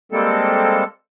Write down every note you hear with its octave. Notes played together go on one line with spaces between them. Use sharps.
G3 G#3 A#3 C4 A4